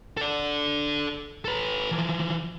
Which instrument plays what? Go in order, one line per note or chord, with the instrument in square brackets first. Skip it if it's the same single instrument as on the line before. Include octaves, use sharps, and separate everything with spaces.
[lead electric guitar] A4 D5
A4 B4
E3 F3